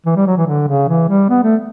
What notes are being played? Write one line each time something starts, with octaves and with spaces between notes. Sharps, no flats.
E3
G3
F#3
E3
D3
C#3
E3
G3
B3
A3